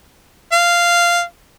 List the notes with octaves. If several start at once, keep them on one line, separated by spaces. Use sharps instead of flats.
F5